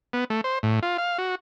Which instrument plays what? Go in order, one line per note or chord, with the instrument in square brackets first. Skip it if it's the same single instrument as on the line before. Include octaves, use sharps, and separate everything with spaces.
[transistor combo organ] B3
A3
C5
A2
F4
F5
F#4